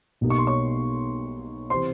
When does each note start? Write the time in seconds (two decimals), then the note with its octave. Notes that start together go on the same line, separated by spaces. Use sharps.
0.21 B1 B2 G3 A#3 D#4
0.30 C#6
0.38 C6
0.47 C#5 C#6
1.70 C3 E3 C5 C6